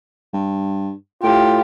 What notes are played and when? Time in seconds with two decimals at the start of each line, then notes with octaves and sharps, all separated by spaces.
0.33 G2
1.23 A2 F4 G4